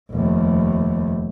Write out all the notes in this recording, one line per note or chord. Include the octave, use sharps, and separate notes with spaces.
F1 D#2